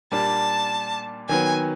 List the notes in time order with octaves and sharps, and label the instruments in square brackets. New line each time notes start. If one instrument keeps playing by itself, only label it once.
[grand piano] A#2 G3 A#3 D4 [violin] A5
[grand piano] D#3 F#3 B3 [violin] G#5